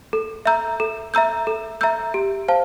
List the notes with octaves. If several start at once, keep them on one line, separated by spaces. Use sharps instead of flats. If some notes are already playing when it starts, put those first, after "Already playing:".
A4
E5 A#5 E6 G6
A4
E5 A#5 E6 G6
A4
E5 A#5 E6 G6
G4
C5 F5 A5